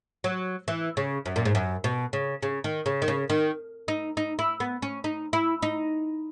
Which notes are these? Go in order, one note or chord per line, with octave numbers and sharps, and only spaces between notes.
F#3
E3
C#3
F#2
A#2
G#2
F#2
B2
C#3
C#3
D#3
C#3
D#3
C#3
D#3
D#4
D#4
E4
B3
C#4
D#4
E4
D#4